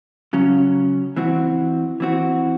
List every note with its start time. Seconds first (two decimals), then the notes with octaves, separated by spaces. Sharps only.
0.33 C#3 F#3 C#4
1.16 E3 C4 F#4
2.00 E3 C4 F#4